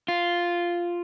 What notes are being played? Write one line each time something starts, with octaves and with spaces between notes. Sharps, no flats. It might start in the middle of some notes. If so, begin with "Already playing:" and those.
F4